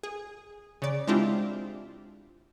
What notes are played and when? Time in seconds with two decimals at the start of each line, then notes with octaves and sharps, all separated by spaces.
0.03 G#4
0.82 C#3 D5
1.07 G#3 C4 D4 E4 F4 G4